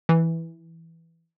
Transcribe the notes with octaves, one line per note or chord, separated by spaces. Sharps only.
E3